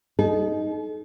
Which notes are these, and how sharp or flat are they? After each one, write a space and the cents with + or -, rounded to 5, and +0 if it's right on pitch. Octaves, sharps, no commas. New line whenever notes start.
D#4 +0 A4 -40